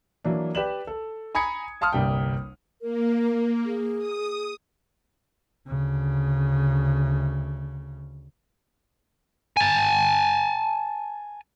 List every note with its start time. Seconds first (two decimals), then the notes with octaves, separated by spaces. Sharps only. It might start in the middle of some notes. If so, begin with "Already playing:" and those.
0.24 E3 F#3 A#3 D4
0.55 G4 B4 D5 E7 F#7
0.87 A4
1.35 G#5 A#5 B5 D#6 G#6 C#7
1.81 F5 A5 C6 D#6 F6
1.93 G1 C2 G3 A#3 G5
2.82 A#3 A#4
3.65 G#4
3.98 D#6
5.67 D2 C#3
9.57 G#5 A5